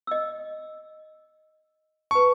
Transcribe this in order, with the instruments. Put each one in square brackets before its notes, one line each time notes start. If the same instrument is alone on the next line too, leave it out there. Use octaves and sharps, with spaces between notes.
[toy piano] D#5 E6
[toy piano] B4 A5 [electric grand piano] C#6